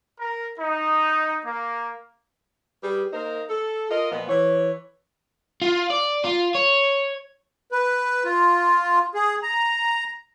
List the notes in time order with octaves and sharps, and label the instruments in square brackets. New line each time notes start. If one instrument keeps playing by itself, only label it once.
[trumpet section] A#4
D#4
A#3
[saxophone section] G3 G4 G#4 B4
A#3 D#4 A#4 C5
A4
F4 A#4 D#5
A#2 F3 B3
E3 C#5
[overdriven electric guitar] F4
D5
F4
C#5
[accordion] B4
F4
G#4
A#5